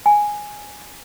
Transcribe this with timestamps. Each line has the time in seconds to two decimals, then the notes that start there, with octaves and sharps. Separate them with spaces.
0.06 G#5